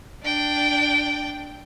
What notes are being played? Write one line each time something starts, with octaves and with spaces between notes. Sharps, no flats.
D4 G5